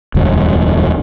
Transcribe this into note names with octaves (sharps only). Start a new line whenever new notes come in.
E1 D2 G2